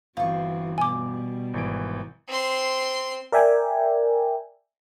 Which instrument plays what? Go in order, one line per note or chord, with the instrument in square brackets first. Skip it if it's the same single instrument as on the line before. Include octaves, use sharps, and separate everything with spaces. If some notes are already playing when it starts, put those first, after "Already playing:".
[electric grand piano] G1 [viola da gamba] E3 C4 F#4 [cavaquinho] F4 C#6
[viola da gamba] B2 G3 [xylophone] G#5 D6
[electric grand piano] G#1 E3 D7
[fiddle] C4 C6
[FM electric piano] A#4 D5 E5 G5 G#5